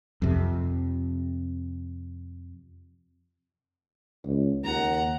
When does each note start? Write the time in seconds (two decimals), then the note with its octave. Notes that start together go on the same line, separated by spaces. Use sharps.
0.22 F2 C3
4.25 C#2
4.64 D#2 F#5 A#5